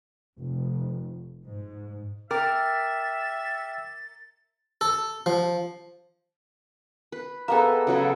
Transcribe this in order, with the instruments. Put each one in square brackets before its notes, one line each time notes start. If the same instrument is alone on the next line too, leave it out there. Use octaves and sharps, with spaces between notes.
[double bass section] F1
G#2
[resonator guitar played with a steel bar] A#4 [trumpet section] E5 [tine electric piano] G5 D6 F6 [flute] A6
[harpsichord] A4
F3
[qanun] B4
[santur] A#3 B3 G#4 [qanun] A4 D#5 E5
[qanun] C#3 F#3 A4